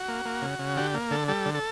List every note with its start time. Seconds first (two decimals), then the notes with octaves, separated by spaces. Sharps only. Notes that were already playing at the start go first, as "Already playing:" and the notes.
Already playing: F#4
0.08 A#3
0.25 A#3
0.42 C#3
0.59 C#3
0.77 D3 G4
0.94 A#3
1.11 D3 A4
1.28 G3 A4
1.46 D3
1.54 A4